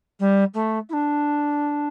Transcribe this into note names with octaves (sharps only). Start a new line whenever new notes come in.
G3
A3
E4
D4